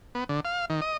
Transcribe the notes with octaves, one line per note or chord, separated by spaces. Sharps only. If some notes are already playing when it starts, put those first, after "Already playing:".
B3
D3
F5
D#3
D#5